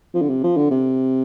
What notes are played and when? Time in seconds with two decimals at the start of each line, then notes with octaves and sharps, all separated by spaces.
0.14 F3
0.22 D3
0.29 C3
0.44 F3
0.57 D3
0.71 C3